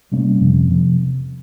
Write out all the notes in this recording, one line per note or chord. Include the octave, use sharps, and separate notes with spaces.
C3 G3 A#3 C#4
F2 C3 F3
C3 F3